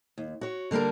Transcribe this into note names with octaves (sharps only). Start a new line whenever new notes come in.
D#2
F#4 C#5
D3 G3 A#3 A4 A#4